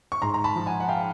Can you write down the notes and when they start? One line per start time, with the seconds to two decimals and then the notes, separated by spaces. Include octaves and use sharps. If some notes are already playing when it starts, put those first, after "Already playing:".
0.12 C#6
0.22 G#2 A#5 C6
0.34 A#5
0.44 A5 B5
0.56 F3
0.66 F#5 G#5
0.80 F#5
0.89 F5 G5